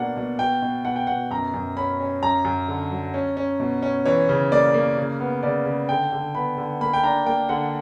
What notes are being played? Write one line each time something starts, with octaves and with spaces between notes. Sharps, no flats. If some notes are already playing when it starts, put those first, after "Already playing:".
Already playing: B2 A#3 D4 F#5
B2
B2 G5
B2
B2 F#5
G5
B2 F#5
F#2 A#5
F#2
C#4 B5
C#4
F#2 A#5
F#2
D3
F#3
C#4
C#4
B2
C#4
E3 C#5
C#3
A#3 D5
A#3
C#3
B3
C#3 D5
C#3
D3 G5
D3
B3 B5
D3
A#3 B5
G5
D4 A#5
A#3 G5
D3 F#5